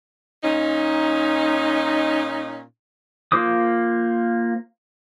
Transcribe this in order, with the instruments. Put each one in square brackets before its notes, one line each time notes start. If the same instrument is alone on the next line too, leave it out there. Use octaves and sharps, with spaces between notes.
[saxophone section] A#2 C#4 D#4
[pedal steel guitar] A#3 F4 C5 D6 D#6